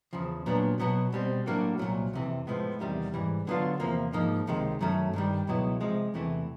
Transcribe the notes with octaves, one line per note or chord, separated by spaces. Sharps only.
E2 C#3 F3
A#2 F#3 B3 D4
B2 F#3 B3
B2 G3 C4
A2 F#3 A#3 D4 F#4
C2 A#2 F#3
F2 C3 E3
A2 F3 G#3 B3
E2 C3 D#3 G3
G#2 E3 G3
D3 F#3 B3 D4 F4
E2 C3 F3 A#3
G#2 F3 A#3 D#4
C#2 C3 D#3 G#3
F#2 D#3 F#3 A3 C#4
G2 D#3 G3
C#2 B2 F#3 B3 E4
C3 F3 G#3
E2 C3 E3 A3